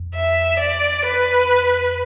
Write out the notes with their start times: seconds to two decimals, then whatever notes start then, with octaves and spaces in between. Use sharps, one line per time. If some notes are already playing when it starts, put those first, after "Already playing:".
Already playing: F2
0.15 E5
0.59 D5
1.05 B4